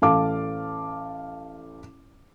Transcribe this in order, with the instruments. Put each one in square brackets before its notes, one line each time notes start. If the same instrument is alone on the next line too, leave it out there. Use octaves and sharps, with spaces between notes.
[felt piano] A1 A4 F5 A5 D6